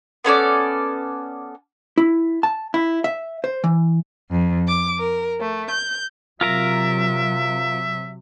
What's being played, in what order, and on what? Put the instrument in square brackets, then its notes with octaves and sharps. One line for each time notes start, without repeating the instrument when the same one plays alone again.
[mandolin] B3 C#4 A4 D5
[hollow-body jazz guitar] E4
A5
E4
E5
C5
E3
[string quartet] F2
D6
A#4
A3
G6
[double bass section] C3 F#3 [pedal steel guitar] F4 A#4 A#5 [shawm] E5